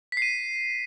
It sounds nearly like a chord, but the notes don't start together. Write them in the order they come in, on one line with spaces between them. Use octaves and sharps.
B6 C7 D#7